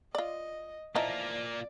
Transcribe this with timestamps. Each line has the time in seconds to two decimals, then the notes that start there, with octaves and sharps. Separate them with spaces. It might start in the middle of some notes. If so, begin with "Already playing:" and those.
0.15 F4 D5 D#5
0.95 E3 F3 A#3 D#4 F4 D5